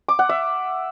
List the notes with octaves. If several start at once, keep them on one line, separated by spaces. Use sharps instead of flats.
D6
F#5
E5